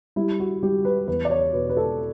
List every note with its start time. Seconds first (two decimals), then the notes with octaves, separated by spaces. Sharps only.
0.16 G3 E4
0.40 F#4
0.63 G3 G4
0.85 B4
1.08 E2 B4
1.25 D5
1.30 C#5
1.53 B2 B4
1.70 B4
1.77 A4